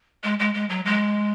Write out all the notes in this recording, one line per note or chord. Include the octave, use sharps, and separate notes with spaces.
G#3
G#3
G#3
F#3
G#3